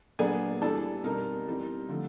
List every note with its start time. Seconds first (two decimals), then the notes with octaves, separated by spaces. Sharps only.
0.19 A#2 F#3 B3 D4 G#4 G#5
0.62 E3 G3 B3 D4 A4 A5
1.04 B2 G3 C4 D#4 A#4 A#5
1.47 E3 G3 C4 D#4
1.89 D3 F3 A3